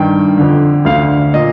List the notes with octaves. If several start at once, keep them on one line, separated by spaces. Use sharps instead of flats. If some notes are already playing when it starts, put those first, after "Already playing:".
Already playing: G2 D#3 G5
F2 D3
D2 D3 F5
A#2 D#5